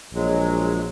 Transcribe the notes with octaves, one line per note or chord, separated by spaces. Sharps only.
A#1 F#3 G#3